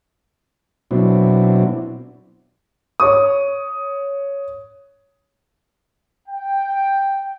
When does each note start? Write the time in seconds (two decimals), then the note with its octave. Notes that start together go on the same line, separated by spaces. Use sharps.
0.91 B2 F#3 C4 D4 E4
3.00 C#5 C#6 D#6
6.28 G5